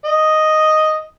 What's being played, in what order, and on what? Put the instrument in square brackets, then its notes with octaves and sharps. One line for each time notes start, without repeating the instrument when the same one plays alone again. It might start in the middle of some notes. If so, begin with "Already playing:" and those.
[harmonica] D#5